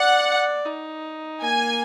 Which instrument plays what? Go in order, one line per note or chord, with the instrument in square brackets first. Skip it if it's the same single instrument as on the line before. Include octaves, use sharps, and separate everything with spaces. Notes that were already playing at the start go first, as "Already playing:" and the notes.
Already playing: [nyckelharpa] D5 [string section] F#5
[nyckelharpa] D#4
[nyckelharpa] A#3 [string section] G#5